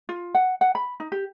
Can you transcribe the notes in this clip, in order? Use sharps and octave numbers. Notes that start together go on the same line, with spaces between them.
F4
F#5
F#5
B5
D#4
G4